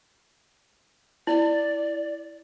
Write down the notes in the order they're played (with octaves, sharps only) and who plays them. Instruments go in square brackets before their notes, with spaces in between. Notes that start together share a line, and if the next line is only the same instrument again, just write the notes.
[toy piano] E4 [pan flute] D5